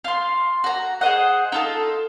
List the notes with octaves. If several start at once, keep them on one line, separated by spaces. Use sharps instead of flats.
F4 C6
F#4 A#5
G#4 C5 D#5 F#5
D#4 F4 A4